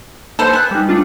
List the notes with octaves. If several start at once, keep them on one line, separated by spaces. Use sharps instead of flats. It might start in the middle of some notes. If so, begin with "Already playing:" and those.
A#3 A4 B4 C5
B3 G#5 F#6
G3 D#4
A3 D4 F4